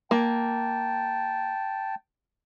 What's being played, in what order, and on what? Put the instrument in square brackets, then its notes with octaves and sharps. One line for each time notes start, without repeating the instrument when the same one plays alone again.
[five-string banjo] A#3 [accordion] G5 A5